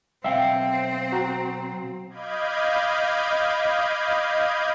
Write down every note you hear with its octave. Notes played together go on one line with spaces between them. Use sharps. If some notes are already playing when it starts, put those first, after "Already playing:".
B1 C4 E5 F5 G5
F#4 A#5
D#5 F5 B5 D6 G6 G#6